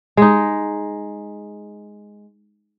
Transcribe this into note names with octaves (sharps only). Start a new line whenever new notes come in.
G#3 D#4